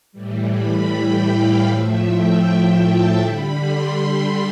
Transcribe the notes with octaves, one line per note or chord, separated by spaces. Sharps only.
A2 E3 G3
B5
G5
F5
A2 F3 A3 E5
G5
A5
D3 G3 B5
C6
B5